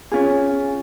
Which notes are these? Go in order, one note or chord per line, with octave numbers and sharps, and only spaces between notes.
C#4 F4 G#4